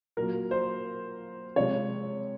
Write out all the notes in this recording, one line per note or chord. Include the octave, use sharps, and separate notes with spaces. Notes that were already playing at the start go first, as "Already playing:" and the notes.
A#2 F#3 A#3 A#4
C5
C3 F3 G#3 C#5